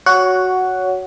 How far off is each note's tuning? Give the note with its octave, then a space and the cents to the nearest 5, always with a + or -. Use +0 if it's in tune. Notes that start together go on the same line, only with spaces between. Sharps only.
F#4 +0 C#5 +15 F#5 +0